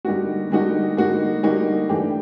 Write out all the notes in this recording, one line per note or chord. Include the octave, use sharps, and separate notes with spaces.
D3 G3 A#3 D#4 F#4
D3 G3 A#3 D#4 F#4
D3 G3 A#3 D#4 F#4
D3 G3 A#3 D#4 F#4
E3 A3 D4 G4